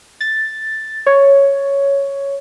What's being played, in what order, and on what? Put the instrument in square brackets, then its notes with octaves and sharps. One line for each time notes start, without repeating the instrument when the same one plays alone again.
[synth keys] A6
C#5